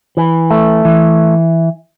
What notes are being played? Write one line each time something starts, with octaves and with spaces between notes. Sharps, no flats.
E3
A3
E3